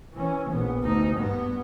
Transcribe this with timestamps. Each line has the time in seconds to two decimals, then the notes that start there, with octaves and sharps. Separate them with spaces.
0.14 E3 C#4
0.51 A#1 B3
0.83 D2 D#4
1.17 G2 B3